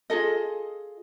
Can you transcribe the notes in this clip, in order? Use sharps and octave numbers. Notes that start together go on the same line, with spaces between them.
F4 G#4 A4 D#5